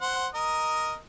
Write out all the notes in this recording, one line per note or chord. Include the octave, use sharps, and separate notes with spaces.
C5 F#5
A#4 D#5 D#6